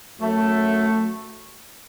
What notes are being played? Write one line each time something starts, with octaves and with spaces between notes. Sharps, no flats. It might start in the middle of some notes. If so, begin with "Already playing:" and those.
F#2 F#3 A3